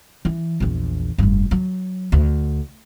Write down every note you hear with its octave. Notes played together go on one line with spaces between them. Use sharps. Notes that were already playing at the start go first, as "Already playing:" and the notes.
E3
A#1 E2
F1 G2
F#3
D2